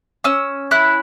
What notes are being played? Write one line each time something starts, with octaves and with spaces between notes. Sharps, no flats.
C#4 E6
E4 F#6